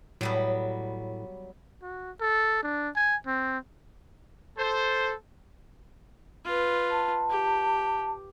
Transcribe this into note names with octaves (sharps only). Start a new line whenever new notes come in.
A2 F#3 G3 B3
F#4
A4
D4
G#5
C4
A4 C5
F4 B4
A5
G4